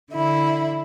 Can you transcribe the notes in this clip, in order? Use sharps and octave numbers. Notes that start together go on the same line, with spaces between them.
D3 E4